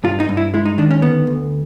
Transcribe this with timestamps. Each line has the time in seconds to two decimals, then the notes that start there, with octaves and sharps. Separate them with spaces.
0.04 G2 F4
0.20 D#4
0.29 G2
0.37 E4
0.54 G#3 E4
0.65 D#4
0.78 D#3 D4
0.91 C#4
1.02 D2 B3
1.27 D2